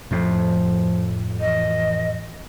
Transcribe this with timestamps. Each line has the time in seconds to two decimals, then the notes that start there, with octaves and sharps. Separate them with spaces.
0.11 F2 A2 F3
1.40 E3 D#5